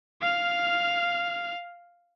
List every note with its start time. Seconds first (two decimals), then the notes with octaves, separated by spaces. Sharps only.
0.21 F5 F6